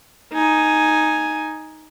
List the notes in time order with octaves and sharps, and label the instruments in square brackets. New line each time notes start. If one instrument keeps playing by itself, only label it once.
[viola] D#4 G#5